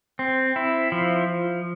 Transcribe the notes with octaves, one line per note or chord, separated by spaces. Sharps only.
C4
E4
F3